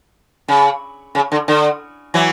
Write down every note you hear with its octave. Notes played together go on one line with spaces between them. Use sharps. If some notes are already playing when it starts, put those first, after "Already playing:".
C#3
C#3
D3
D3
E3 F#3